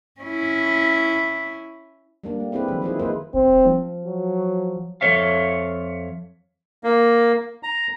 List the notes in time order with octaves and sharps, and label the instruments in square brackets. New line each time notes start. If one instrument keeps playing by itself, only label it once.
[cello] C#4 E4
[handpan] G3 A#3 D4
A3
C4 E4 G4 G#4 B4
D#3 E3 F#3
F3 E4 G#4
A#3 D#4 G#4 B4 C5
[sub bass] D#1 [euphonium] C4
[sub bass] F3
[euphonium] F#3
[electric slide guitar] F2 B3 A4 C#5 E5 F5
[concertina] A#3
A#5